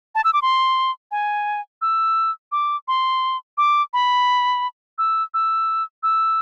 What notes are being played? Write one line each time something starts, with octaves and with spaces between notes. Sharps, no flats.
A5
E6
D6
C6
G#5
E6
D6
C6
D6
B5
E6
E6
E6